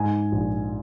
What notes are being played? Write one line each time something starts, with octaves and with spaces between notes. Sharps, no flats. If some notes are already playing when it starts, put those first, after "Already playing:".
Already playing: G#2 G#5
A#1